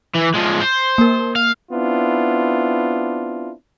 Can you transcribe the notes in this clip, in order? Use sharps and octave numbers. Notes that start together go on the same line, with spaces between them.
E3
F3 G#3
C5
A#3 A#4
F5
B3 C4 D4 E4 F4